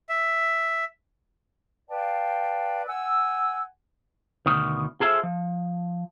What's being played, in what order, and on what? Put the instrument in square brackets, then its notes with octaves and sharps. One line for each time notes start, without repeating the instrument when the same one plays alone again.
[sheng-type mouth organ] E5
[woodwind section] B4 D5 F5 G5 A5
F#5 G#5 E6
[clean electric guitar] D2 G2 B2 D#3
F4 G#4 A4 C5 E5
F3